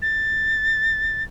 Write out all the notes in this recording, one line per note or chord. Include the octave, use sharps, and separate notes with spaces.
A6